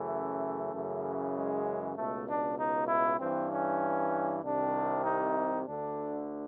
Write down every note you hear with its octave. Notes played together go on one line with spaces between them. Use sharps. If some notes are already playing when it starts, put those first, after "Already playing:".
Already playing: F#2 C#3 E3 A3
F#2 C#3 E3
G#3
C#2 B2 A3
D4
D#4
E4
G2 E3 C4
C#4
C2 C3 D#3 D4
D#4
D2 D3 D4